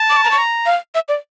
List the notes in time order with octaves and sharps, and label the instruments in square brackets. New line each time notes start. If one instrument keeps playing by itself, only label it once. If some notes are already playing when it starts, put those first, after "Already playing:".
Already playing: [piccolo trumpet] A5
[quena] D6
C#6
A#5
C#6
[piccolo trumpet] A#5
[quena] F5
E5
D5